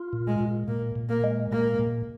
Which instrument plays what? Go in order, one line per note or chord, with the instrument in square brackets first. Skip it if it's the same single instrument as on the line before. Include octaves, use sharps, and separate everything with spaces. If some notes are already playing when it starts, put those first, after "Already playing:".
Already playing: [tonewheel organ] F4
A#2
[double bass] G#3
[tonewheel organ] A#2
[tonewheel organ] A#2 [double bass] A#3
[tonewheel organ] A#2
[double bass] A#3
[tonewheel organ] G#3
[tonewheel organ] A#2 [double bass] A#3
[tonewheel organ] A#2